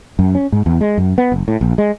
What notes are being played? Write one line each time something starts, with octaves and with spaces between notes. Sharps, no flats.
F#2
C#4
G#2
E2
G#3
F#2
B3
F#1
A2
A#1
G#3